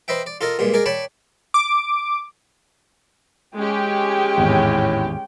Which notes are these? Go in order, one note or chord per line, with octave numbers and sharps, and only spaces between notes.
B4 C5 D#5 E5 G5
D5
F4 A4 A#4 D#5
G2 A#2 G#3
G#4 A#4 D5 D#5
C#5 D5 G5 A5 B5
D6
G#3 C#4 G4 G5
G#1 E2 A2